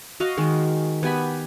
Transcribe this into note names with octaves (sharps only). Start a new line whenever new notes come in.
F#4 D#5 F5
D#3 G#3
B3 G4 G#5 B5